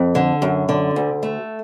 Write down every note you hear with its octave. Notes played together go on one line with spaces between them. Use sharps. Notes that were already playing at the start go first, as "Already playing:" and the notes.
Already playing: F2
D3
F#2
D3
D2
A3